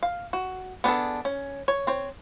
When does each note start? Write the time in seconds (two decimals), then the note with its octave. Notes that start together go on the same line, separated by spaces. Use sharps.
0.03 F5
0.33 F#4
0.84 B3 D4 G#4 A4
1.25 C#4
1.68 C#5
1.87 C4 C#5